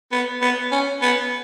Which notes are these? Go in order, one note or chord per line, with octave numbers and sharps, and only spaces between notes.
B3
B3
C#4
B3